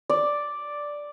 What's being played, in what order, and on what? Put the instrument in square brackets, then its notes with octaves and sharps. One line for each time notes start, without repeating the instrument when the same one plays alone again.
[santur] D5